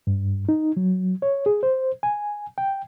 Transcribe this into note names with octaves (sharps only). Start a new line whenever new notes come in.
G2
D#4
F#3
C#5
G#4
C5
G#5
G5